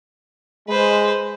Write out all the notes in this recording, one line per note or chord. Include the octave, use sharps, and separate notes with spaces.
G#3 B4 C5